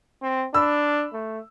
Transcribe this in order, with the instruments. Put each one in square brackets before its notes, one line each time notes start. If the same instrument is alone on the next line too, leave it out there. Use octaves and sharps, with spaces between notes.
[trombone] C4
[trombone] D4 [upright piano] B5 E6
[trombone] A3